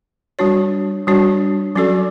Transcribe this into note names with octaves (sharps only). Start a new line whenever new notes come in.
G3 D4 F#4 C#5
G3 D4 F#4 C#5
F#3 C#4 F#4 A4 D5